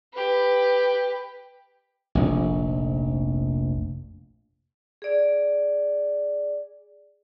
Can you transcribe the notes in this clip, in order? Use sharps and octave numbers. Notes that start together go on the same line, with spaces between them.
G4 B4
F1 A#1
G#4 D5